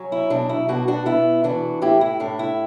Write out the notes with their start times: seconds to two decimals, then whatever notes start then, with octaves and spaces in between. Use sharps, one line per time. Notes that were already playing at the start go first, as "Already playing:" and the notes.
Already playing: F#3 C#4
0.12 E4
0.30 B2 D4
0.49 E4
0.68 B2 D4 F#4
0.88 D4 F#4
1.06 B3 E4
1.44 E3 D4 F#4
1.82 A2 E4 G4
2.01 E4
2.20 A2 D4
2.39 E4